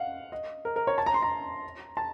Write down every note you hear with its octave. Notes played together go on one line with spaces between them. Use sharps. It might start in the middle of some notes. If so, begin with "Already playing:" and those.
Already playing: F5 F#5
D#5
A#4
A#4
C#5
A5
A#5
C6
A#5
A5